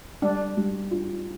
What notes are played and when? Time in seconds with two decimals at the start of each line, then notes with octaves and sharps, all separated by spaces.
0.22 G3 D4
0.57 G3
0.91 F4